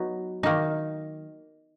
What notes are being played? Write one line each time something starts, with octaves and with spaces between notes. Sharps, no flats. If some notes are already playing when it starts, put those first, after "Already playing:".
Already playing: F#3 B3 D#4
D#3 A#3 D#4